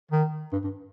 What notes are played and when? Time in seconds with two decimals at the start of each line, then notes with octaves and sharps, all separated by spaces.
0.11 D#3
0.53 G2
0.64 G2